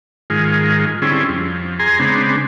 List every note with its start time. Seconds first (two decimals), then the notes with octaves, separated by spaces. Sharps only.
0.30 G#2 D#3 G#3 F4
1.02 D3 G3 C4 C#4 E4 G#4
1.29 F2
1.79 G#4 G#5 A#5 C6
1.99 C#3 G#3 B3 C4 D4